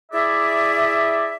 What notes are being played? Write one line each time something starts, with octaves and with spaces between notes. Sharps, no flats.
E4 G#4 D5 E5